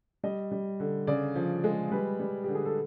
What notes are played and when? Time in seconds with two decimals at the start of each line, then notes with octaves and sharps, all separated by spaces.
0.24 G3 D#5
0.52 G3
0.80 D3
1.07 C#3 D5
1.35 F3
1.64 G#3
1.92 G3 B4
2.20 G3
2.44 D3 G4
2.55 G#4
2.66 A4